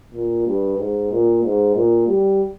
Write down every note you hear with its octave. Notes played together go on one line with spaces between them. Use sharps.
A#2
G2
G#2
A#2
G#2
A#2
G3